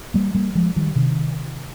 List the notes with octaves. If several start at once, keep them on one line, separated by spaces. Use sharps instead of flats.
G3 A#3
G3 A#3
F3 G#3
D#3 G3
C3 D#3